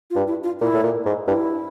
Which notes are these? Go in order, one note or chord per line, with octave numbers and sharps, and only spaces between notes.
F4
G2
E4
F4
A#2 E4
A2
A#2
G#2
G2 E4